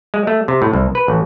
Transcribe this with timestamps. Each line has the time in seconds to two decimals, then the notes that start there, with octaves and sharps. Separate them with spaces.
0.14 G#3
0.27 A3
0.48 C3
0.62 A2
0.73 C2
0.95 B4
1.08 A1